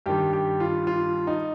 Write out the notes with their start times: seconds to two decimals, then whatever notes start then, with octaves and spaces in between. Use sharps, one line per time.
0.06 G2 D#3 G3 G4
0.33 G4
0.60 F4
0.87 F4
1.27 D#4